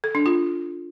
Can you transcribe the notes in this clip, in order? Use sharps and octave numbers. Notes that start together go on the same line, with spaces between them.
A4
D4
F4